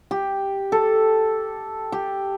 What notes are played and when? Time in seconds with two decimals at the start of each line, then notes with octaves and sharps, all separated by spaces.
0.11 G4
0.72 A4
1.92 G4